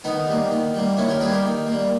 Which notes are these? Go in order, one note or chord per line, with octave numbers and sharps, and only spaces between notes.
D#3 B3 D#4
G3 A#3
D#3
G3 A#3
D#3 C#4 E4
G4 A#4
G3 A#3 G#4 B4
G4 A#4
D#3
A#3
G3